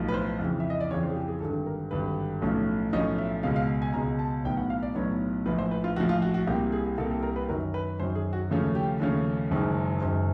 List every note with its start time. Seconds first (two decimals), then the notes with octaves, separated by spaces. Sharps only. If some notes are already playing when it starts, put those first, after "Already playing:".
Already playing: B1 A2 F3
0.08 B4
0.14 C5
0.40 F2 C#3 E3
0.60 E5
0.70 D#5
0.80 D5
0.91 F2 C#3 E3 C#5
1.03 C5
1.10 G#4
1.16 G4
1.28 G#4
1.41 G#1 G2 D3 A4
1.66 A#4
1.91 G#1 G2 D3 B4
2.42 B1 A2 F3 A3 C#4
2.93 B1 A2 F3 A3 C#4 D#5
3.18 E5
3.43 C#2 B2 G#3 F5
3.56 F5
3.82 G#5
3.94 C#2 B2 G#3 A#5
4.19 A5
4.44 B1 A2 F#3 B3 G5
4.57 F#5
4.70 F5
4.83 D5
4.95 B1 A2 F#3 B3 C#5
5.46 A#1 A2 F3 B4
5.58 C5
5.71 B4
5.84 F4
5.96 A#1 A2 F3 F#4
6.09 F4
6.22 F#4
6.34 F#4
6.47 C2 A#2 G3 A#3 G4
6.72 G#4
6.98 C2 A#2 G3 A#3 A4
7.11 A4
7.23 A#4
7.36 B4
7.49 F#2 D#3 F#3 A#4
7.74 B4
8.00 F#2 D#3 F#3 C5
8.15 G#4
8.33 F#4
8.50 D#2 C#3 F3 A3 C#4
8.75 G4
9.00 D#2 C#3 F3 A3 C#4
9.51 F#1 F#2 D#3 G#3
10.02 F#1 F#2 D#3 G#3 C5